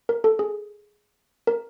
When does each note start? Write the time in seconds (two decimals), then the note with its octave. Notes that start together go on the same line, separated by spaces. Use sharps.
0.09 A#4
0.24 A4
0.39 G#4
1.47 A#4